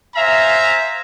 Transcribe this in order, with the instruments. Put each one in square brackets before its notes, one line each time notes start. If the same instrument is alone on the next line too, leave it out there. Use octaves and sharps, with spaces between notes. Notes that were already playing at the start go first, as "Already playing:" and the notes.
[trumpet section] C5 E5 F5 G#5 A#5